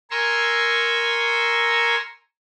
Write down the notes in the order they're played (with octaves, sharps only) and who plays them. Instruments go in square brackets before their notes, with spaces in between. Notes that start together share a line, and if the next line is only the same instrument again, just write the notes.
[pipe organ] A#4 G#5 A#5 C6 C#6 E6